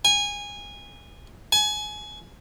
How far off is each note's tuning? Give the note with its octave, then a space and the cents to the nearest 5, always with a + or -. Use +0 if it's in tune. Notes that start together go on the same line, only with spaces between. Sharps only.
G#5 -20
G#5 +25